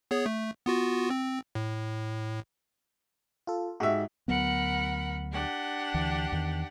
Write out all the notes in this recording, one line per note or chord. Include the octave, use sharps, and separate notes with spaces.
B3 G#4 C#5
A3
B3 F4 F#4
C4
A2
F4 A4
G#2 F#4 G4 E5
D2 F#3 B3 A#4 F#5 B5
D4 G4 F#5
D2 E3
E2 D#3